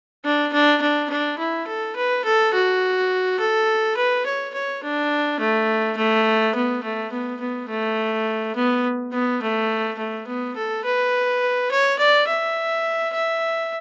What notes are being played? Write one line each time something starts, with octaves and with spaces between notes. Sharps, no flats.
D4
D4
D4
D4
E4
A4
B4
A4
F#4
A4
B4
C#5
C#5
D4
A3
A3
B3
A3
B3
B3
A3
B3
B3
A3
A3
B3
A4
B4
C#5
D5
E5
E5